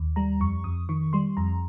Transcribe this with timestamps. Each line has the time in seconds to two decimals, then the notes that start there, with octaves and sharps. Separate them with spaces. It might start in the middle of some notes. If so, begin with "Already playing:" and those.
Already playing: D#2
0.16 G3 A#5
0.40 F2 C#6
0.64 F2 D#6
0.89 D#3 C#6
1.13 G3 C6
1.37 F2 A#5